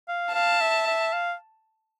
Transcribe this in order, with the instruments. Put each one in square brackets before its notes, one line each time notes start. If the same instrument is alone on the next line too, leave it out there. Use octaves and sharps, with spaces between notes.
[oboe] F5
[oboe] F5 [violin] A5
[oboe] E5
E5
F5